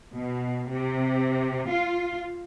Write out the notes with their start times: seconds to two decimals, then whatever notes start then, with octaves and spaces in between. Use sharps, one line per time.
0.15 B2
0.71 C3
1.71 F4